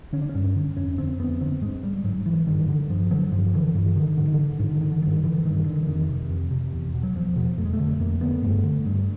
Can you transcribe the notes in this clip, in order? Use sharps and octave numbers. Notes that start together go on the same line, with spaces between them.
D3 C#4
D4
C#4
G2
D3
F2 C#4
D3 C4
F2 B3
D3 C4
G#2 G#3
G3
G#2 F#3
E3
G2 D#3
D3
G2 F3
D3 F#3
G2 F3
D3 E3
G2 E3
D3 D#3
G#2 D3
D#3
D3
G#2 D3
D3
D#3
D3
G2 D#3
D3 E3
G2 D#3
D3
E3
F2 D#3
C3
F2
C3
E2
B2
F#3
E2 F3
B2
F2 A3
G#3
A3
D3
F2 A#3
D3 B3
G2 A3
D3
G2